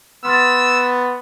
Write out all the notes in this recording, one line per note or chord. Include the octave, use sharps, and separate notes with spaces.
B3 C6 E6 F6 A6